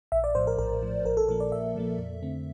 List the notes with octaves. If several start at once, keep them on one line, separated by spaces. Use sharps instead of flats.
A#1 E5
D5
A2 F3 C5
A#4
A#1 A#4
A2 F3
A#1 A#4
A4
A#2 F3 A#3 A#4
D5
A#1 E5
A#2 F3 A#3
F2
D3 A3 C4